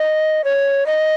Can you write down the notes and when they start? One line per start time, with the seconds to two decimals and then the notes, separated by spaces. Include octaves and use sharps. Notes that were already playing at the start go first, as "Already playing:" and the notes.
Already playing: D#5
0.44 C#5
0.86 D#5